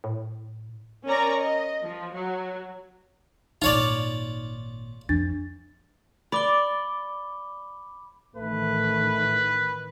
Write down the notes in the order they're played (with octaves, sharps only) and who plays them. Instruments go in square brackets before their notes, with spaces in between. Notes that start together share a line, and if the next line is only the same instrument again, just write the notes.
[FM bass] A2
[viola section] C#4 A#4 C#5 D5 A#5
D#5
F3
F#3
[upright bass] G#1 A#2 [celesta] D#4 [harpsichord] F4 C#5 D5
[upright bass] F2 [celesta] D4 A6
[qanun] D5 [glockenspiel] B5 D6 G7
[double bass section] A1 D#3 [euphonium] A3 [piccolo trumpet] B4